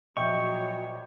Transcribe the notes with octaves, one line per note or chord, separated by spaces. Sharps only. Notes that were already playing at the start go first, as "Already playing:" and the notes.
A#1 F#3 C#5 D#5 E5 G5 C#6 G6